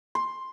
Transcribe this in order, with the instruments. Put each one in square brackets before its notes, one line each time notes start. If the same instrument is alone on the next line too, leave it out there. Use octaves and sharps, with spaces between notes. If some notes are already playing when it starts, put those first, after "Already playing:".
[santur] C6